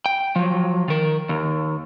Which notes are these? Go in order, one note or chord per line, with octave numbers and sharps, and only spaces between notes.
G5
F3 F#3
D#3 A#4
D#2